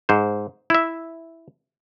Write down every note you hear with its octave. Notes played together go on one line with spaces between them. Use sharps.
G#2 C5
E4 E5